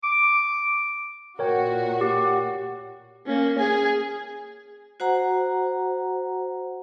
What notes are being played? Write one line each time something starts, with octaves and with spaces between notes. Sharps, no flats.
D6
A#2 F#4 A#4 C#5 G5
G4
A#3 C#4
G#4 G#5
F#4 C5 F#5 A#5